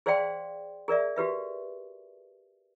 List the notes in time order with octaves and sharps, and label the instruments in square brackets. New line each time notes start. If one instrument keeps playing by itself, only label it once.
[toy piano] G#4 C5 D5 F5 G5 C6
G#4 A#4 D5 E5
F#4 G4 B4 E5